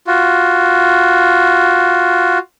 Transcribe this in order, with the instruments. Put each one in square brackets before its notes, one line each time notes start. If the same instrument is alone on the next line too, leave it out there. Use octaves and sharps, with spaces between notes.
[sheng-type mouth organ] F4 F#4